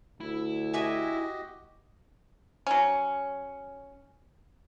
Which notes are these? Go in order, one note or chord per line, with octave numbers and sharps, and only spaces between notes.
D2 E4
F#4 G4 B4 D#5 E5 G#5
F#3 C#4